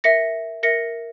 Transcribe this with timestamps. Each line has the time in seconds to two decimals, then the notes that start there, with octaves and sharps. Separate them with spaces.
0.04 A#4 E5 A#6 C#7
0.63 A#4 E5 A#6 C#7